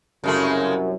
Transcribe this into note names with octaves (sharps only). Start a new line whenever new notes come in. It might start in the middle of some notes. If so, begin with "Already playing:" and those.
C2 F#2 C#3 G#3 A3